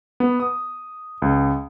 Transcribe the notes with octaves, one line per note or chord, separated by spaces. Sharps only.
B3
D#6
C#2